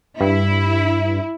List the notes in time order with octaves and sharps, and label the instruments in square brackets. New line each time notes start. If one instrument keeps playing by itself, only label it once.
[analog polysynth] G2 [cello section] E4